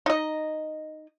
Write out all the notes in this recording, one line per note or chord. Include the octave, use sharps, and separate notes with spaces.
D#4 D#5